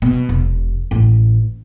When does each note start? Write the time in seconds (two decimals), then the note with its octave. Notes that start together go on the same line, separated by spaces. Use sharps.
0.02 B2
0.29 E1
0.91 A1